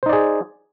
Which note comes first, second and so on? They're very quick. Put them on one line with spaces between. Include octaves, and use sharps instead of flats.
C5 D#4 D5 G#4